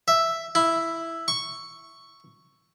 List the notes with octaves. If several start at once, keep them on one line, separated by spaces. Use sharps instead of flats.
E5
E4
C#6